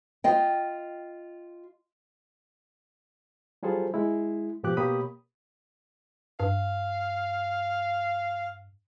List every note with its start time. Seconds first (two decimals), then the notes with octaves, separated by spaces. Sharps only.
0.24 F4 D#5 G5
3.63 F#3 G3 F4 G#4 A4 C5
3.94 G#3 E4
4.63 G#2 B2 F3 G4 D6 F#6
4.77 B2 A#3 G4 C#5 B5 D#6
6.40 G2 F5